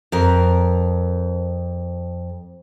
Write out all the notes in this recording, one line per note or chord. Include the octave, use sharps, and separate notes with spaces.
F2 A#4